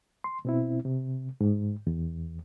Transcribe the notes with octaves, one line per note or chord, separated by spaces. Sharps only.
C6
B2 C4 E4
C3
G#2
E2